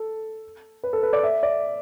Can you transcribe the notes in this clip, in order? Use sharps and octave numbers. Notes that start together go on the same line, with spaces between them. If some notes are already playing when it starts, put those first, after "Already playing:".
Already playing: A4
B4
A4
B4
D5
E5
D5